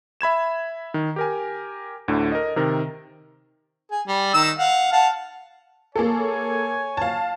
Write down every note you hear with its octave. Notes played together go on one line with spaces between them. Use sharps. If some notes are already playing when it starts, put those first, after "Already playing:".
E5 B5 G#6 E7
D#3
G4 A#4 G#5
D2 A2 D3
A#4 D#5
C3 D#3 A#4
G#4
G3
D#3 E6
F5 F#5
F5 F#5 A5
A#3 G#4 A4 C#5 G#5
F5 A5